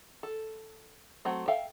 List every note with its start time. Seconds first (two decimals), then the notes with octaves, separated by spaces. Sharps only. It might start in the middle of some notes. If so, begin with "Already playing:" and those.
0.23 A4
1.25 F#3 A3 C4
1.48 A4 E5 F5 G5